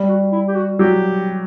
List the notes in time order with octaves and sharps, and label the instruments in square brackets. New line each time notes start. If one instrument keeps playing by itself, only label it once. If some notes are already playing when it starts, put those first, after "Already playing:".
Already playing: [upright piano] G3
[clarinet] F#4
E4
G4
F#4
[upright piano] F#3 [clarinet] G4